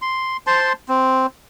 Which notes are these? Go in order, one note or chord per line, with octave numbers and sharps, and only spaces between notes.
C6
C5 A5 C6
C4